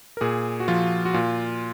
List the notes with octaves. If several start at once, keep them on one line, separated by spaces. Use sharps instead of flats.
A#4
A#2 G#4
F#4
F3 F4
F#4
A#2 F4